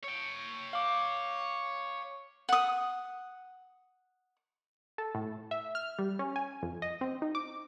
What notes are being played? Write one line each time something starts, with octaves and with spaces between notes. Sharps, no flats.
C#5 G5
F5 D6
F#5 D#6
A4
A2
E5
F6
G3
C#4
G#5
F2
D#5
C4
D#4
D6